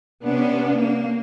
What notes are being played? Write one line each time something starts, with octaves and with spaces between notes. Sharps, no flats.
C3 B3 C#4 D4
A#3